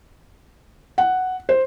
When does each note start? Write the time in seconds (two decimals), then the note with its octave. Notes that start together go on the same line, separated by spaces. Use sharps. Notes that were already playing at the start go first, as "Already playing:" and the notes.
0.98 F#5
1.49 C5